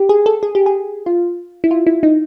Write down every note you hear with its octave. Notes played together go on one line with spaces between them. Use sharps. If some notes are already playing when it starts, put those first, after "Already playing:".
Already playing: G4
G#4
A4
G#4
G4
G#4
F4
E4
F4
E4
D#4